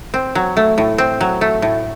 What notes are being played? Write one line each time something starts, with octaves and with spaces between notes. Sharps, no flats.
C4
F#3
A3
A2
C4
F#3
A3
A2